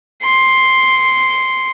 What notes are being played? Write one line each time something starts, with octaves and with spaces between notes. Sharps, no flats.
C6 C#7